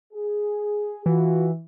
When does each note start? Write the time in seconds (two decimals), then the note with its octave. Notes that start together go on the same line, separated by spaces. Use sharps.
0.12 G#4
1.06 E3 F4 F#4